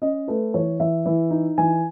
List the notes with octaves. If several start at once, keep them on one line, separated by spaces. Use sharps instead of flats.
C#4 D#5
A3 B4
E3 C#5
E3 E5
E3
D#4
E3 G#5